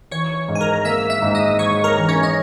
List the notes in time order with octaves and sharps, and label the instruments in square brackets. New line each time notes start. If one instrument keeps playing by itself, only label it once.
[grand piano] E3 [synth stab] C#5 C#6
[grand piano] G#2
[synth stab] G#5
A#4 A#5
[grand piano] A#3 [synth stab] E5 E6
[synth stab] E5 E6
[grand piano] G#2
[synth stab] D#5 D#6
[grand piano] G#2 [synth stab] C#5 C#6
[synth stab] A#4 A#5
[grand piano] E3
[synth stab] C#4 C#5
D#5